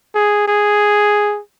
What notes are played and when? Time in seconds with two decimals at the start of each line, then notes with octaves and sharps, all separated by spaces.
0.15 G#4
0.48 G#4